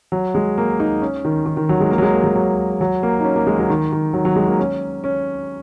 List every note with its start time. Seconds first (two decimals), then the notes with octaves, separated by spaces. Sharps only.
0.12 F#3
0.35 G#3
0.58 A#3
0.80 D#4
1.01 C#4
1.25 D#3
1.46 D#3
1.57 D#3
1.69 F#3
1.80 G#3
1.91 A#3
1.98 F#3
2.02 G#3
2.13 A#3
2.24 G#3
2.36 F#3
2.81 F#3
3.03 A#3
3.20 D#4
3.24 C#4
3.36 A#3
3.47 G#3
3.59 F#3
3.70 D#3
3.92 D#3
4.14 F#3
4.25 F#3
4.36 G#3
4.47 A#3
4.59 C#4
5.04 C#4